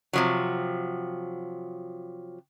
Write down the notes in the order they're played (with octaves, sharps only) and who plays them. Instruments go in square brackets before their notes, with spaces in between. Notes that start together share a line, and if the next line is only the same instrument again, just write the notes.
[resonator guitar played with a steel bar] C3 F3 F#3